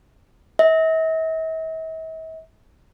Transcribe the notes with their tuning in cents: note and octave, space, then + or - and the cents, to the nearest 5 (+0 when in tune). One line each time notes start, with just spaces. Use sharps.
E5 -45